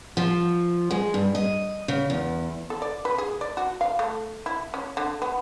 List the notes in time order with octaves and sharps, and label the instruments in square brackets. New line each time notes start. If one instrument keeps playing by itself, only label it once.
[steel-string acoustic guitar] F3
G#3
G2
D#5
C#3
E2
[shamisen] A4
D5
B4
G#4
D5
F#4
F5
A3
E4
C#4
D3
B3